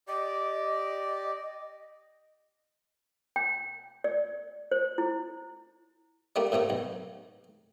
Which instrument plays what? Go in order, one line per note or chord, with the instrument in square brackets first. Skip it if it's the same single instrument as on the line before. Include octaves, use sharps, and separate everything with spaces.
[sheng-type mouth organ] G4 D5 [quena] D#5
[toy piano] G5
D5
C5
E4
[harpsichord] G3 A3 A#3 D4
A2 C3 A3 A#3
B1